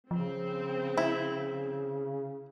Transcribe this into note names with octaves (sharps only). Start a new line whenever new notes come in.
C#3 F3 C4
E4